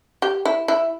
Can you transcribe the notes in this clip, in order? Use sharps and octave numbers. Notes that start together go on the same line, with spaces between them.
G4
E4
E4